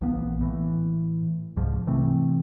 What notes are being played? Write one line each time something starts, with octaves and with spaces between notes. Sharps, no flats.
A#1 E3 A#3 B3
A2 E3
C2 G#2 F3
C3 E3 A3 C4